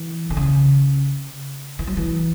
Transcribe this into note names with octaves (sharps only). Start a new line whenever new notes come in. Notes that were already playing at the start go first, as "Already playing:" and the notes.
Already playing: E3
D3
C#3
E3
F#3
E3